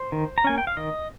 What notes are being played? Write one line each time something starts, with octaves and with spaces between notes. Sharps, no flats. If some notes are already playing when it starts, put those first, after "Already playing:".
Already playing: C5
D#3
A#5
A#3 C#4 G#5
G5
F5
D#3 D#5